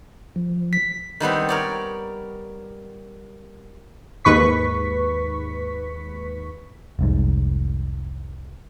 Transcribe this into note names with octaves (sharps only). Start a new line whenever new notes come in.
F3
B6
D#3 G3 B3 C4
A#4 C#5 D5
D#2 G#2 B4 C#6 B6
F1 C2 G#2